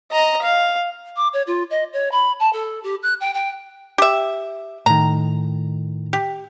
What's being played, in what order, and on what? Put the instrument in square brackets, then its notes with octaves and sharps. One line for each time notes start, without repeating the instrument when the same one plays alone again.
[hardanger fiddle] D#5 A#5
F5
[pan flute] D6
C#5
F4
D#5
C#5
B5
A5
A4
G4
F#6
G5
G5
[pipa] G4 E5
[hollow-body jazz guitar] A2 D#3 [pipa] A#5
[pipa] G4